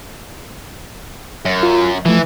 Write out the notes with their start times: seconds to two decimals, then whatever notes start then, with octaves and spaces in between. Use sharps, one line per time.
1.45 F#2
1.63 F4
2.06 E3 F3 A3